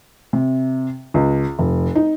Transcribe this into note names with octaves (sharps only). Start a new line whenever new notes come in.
C3
C#2
F1
D#4